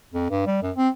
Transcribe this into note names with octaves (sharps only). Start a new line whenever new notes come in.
F2
G2
G3
F#2
C4